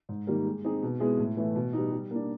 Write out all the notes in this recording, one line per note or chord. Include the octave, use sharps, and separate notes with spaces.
G#2
D#3 G3 A#3
G#3
C4 D#4 G#4
B2
G#3 B3 E4 G#4
A2
E3 A3
B2
G3 B3 D#4
G3
A#3 D4